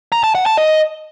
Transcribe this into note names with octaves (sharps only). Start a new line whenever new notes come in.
A#5
A5
F#5
A5
D#5